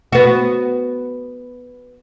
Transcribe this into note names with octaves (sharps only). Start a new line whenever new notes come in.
B3 F#4